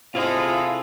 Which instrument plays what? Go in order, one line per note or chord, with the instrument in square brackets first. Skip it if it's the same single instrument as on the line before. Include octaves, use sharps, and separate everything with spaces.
[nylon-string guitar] C3 [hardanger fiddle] G#3 A4 [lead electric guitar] E4 F4 [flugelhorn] F5